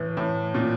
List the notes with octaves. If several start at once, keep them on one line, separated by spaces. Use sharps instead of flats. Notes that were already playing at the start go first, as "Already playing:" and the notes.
Already playing: A2 E3
A2
A#2